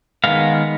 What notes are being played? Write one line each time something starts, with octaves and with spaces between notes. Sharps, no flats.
D#3 G#3 B3 F5